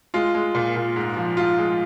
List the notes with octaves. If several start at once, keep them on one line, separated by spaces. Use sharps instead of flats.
G#3 F4
G#3
A#2
A#2
G#2
F3
G#2 F4
G#3